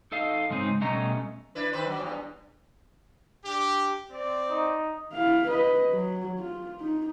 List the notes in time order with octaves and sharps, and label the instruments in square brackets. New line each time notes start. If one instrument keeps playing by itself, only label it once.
[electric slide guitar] D#4 A4 D#5 F5
G#2 C#3 G#3 C4 D#4
B2 G3 A3 C#4 D#5 A#5
[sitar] D4 E4 B4
D#3 B4 C5
F#3
E2 G2
[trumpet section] D4 G4
C4 D5
[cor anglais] D#4
[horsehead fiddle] E4 F5
B4 D#5
F#3
F4
D#4